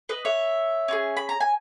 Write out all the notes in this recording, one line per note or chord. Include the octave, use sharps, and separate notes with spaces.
B4 D#5
C#5 E5
C#4 E4 G#4
B5
A#5
G#5